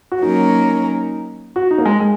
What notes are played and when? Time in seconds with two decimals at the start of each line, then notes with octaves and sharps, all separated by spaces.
0.12 F#4
0.21 F#3 A#3 C#4 D#4 A#4
1.56 F#4
1.71 D#4
1.78 A#3
1.86 G#3
2.00 G#3